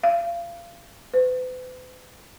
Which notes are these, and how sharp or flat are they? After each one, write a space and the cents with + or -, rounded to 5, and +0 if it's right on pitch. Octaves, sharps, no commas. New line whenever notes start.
F5 -30
B4 +45